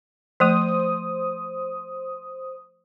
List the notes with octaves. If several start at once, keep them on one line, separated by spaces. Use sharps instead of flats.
F3 A3 C5 D#6